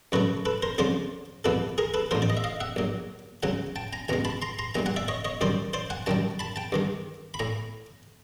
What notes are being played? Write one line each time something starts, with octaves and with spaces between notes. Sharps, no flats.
F#2 C#3 F#3 A3 B4 C#5
A4 B4
A#4 C5
F2 C#3 F3 G#3 C5 D5
C2 A#2 F3 A4 B4
G#4 A#4
A4 B4
A1 A2 F3 A#4 C5
D5
D#5
E5
D#5 F5
E5 F#5
A#1 A#2 F#3
C#2 C#3 F#3 F#5 G#5
G5 A5
G#5 A#5
C#2 B2 G#3 G#5 A#5
A5 B5
A#5 C6
A#5 C6
A#1 A#2 G3 G#5 A#5
F#5 G#5
D5 E5
C#5 D#5
C#5 D#5
F#2 D#3 G3 C5 D5
C5 D5
F#5 G#5
F#2 D#3 G3 G5 A5
A5 B5
G5 A5
G2 D#3 G#3
B5
A2 G#5 A#5